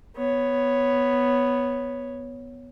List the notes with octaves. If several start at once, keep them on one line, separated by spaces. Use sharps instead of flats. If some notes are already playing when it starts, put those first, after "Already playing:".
B3 C#5